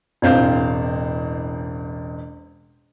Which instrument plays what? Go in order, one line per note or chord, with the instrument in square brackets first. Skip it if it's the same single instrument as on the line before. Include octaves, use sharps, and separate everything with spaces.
[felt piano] E1 A1 C4 F5 G6